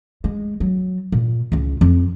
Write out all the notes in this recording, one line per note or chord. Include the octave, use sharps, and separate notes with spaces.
G#3
F#3
A#2
C#2 F4
F2